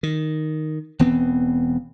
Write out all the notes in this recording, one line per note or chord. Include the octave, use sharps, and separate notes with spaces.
D#3
E1 E3 B3 C4